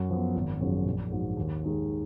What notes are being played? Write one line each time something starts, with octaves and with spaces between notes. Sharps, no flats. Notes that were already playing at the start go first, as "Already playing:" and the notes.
Already playing: F#2
F3 B3
G#1
F#2 C#3 F3
A#1
G#2 F#3
D#2
D#3 G#3 D#4 G#4